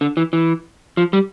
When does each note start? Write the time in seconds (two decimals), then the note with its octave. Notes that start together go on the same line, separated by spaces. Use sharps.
0.01 D3
0.17 E3
0.33 E3
0.97 F3
1.13 G3